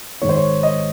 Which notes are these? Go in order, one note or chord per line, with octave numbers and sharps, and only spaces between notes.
G#1 G#2 D#3 G#3 D#4 C#5
C5
C#5
D#5